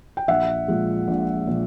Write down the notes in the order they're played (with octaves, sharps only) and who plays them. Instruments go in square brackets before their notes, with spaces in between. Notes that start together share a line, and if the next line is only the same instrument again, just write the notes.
[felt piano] G5
A#1 E5 F#5
A#2 F3 G#3
A#1
A#2 F3